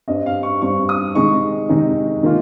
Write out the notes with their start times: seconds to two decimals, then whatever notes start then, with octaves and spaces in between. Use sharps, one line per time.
0.08 G2 G3 C4 D#5
0.26 F5
0.43 C#6
0.62 G2 G3 C4 C#6
0.89 D#6
1.15 C3 D#3 G#3 D#4 C#6
1.69 C3 D#3 G#3 D#4
2.23 D#3 A#3 F4